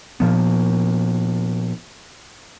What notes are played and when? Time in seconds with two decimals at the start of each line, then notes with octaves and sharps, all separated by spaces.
0.20 A#2 F3 B3